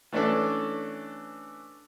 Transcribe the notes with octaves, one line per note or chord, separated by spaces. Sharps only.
E3 A3 C#4 D4 A4